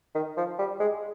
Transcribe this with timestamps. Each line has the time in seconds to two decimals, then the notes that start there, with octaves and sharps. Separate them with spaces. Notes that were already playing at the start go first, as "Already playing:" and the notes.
0.15 D#3
0.37 F3
0.59 G3
0.80 G#3